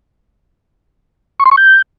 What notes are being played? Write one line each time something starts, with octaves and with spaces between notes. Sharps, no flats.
C#6
C6
C#6
G6